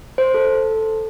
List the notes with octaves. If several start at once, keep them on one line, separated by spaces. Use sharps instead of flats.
C5
A4